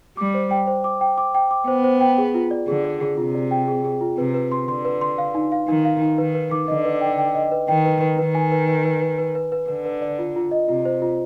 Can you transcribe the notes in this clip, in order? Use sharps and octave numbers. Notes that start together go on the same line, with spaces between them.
G3 D6
C5
G5
C5
D6
G5
D6
G5
D6
B3 C5
C5
G5
G#4
F4
D5
D3 G#4
D5
G#4
C3 F4
D5
G5
G#4
G#4
F4
C3 B4
B4
C6
D3 C6
B4
C6
F5
D#4
F5
D#3 D#4
F5
D#4
D#3 B4
B4
D6
D3 D#5
B4
G5
G5
D#5
B4
D#3 G5
B4
B4
D#3 B4
G#5
B4
B4
B4
B4
B4
B4
B4
D3 B4
B4
D5
F4
F4
D#5
C3 F4
C5
F4